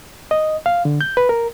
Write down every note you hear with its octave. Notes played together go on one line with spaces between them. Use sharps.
D#5
F5
D3
G6
B4
A#4